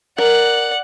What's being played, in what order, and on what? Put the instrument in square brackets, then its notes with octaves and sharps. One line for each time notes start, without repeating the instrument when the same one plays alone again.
[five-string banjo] A#4 [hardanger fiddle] D5 F#5